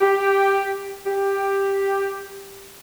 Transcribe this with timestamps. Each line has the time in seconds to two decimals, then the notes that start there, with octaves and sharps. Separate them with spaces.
0.01 G4
1.06 G4